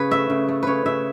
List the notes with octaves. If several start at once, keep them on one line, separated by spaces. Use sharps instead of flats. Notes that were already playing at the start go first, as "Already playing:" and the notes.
Already playing: C#3 B4 C#5
A3 E5
C#3
A3
C#3 B4 C#5
C#3 E5